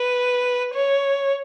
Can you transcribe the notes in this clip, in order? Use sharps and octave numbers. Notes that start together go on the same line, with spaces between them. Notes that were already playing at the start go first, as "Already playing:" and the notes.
Already playing: B4
C#5